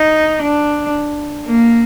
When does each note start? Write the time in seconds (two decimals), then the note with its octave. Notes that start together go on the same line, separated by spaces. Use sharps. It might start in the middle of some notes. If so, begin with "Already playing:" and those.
Already playing: D#4
0.42 D4
1.46 A#3